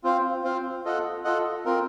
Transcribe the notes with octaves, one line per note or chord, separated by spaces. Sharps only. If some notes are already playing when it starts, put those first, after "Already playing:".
C4 F4 C5 F5
C4 F4 C5 F5
F4 A4 D#5 F#5
F4 A4 D#5 F#5
C4 F4 A#4